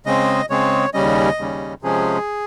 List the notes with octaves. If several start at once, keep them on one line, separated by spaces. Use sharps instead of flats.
C#3 G#3 C4 D#5
C#3 G#3 C4 C#5
D#2 C#3 G3 C#4 D#5
D#2 C#3 G3 C#4
C3 F3 G#3 C#4 G#4